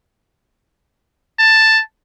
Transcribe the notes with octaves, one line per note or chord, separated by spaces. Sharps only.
A5